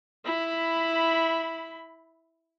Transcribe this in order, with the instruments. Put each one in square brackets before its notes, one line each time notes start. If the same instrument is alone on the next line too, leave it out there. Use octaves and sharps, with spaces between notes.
[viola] E4 B5